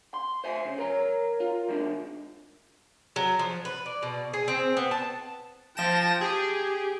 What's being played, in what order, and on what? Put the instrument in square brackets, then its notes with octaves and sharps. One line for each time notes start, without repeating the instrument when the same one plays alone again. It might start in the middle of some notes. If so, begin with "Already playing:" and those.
[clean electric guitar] C6
[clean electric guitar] C5 E5 G#5 [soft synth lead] C7
[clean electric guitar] C#3
[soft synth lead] A#4 [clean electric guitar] C#5 A#5
[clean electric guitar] F4
D#3 G#3 D4
[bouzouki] F#3
F3
B4
D5
B2
G#4
C4
B3
A5
[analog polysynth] F3 A#6 E7 [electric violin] G5 A5
[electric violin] G4 [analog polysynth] G#4